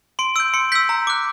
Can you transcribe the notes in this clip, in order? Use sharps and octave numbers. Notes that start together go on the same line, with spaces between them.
C6 D7
E6 G6 D7
C6 C#7
E6 G6 B6
A#5
D6 F#6